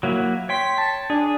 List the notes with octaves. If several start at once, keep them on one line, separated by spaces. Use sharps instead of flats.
F#3 A#3 E4
C#5 G5 C6 B6
A5
D4 G#4